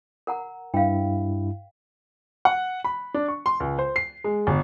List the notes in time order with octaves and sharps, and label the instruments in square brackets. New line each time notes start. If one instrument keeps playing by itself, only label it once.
[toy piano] A#4 F#5 A#5
[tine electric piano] G2 E4 [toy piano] F5 G5
[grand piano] F#5
B5
D4
C#6
C6
C#2
C5
C7
G#3
G1